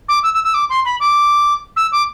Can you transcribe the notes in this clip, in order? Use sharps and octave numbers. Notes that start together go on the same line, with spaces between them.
D6
E6
E6
E6
D6
C6
B5
D6
E6
D6